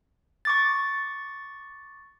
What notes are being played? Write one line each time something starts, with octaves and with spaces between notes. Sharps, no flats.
C#6 D6 A6